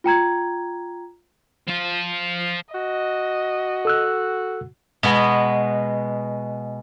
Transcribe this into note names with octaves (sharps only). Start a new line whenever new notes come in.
F4 G5 A#5 G#6
F3 F4
F#4 D#5
A4 E6 F#6
B2 G#3 B3